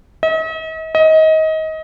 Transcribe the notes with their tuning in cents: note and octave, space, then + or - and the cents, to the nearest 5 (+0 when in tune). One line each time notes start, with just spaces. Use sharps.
D#5 +45
D#5 +25